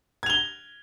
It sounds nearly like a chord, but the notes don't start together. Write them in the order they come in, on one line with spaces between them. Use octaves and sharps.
G#6 F7 G7